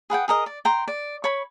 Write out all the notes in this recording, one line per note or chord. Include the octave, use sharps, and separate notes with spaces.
G#4 B4 F#5 G5
G#4 A#4 D#5
D5
G5 A#5 C6
D5
C#5 B5